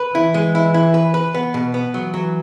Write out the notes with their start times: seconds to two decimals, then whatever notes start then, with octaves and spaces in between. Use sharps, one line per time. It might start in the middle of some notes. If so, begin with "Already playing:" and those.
Already playing: B4
0.15 E3 E4
0.34 G#3
0.55 E4
0.74 E4
0.94 B4
1.14 B4
1.34 B3
1.54 B2
1.74 B3
1.94 E3 F#3
2.14 F#3